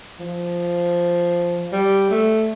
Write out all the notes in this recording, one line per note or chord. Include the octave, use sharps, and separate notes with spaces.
F3
G3
A3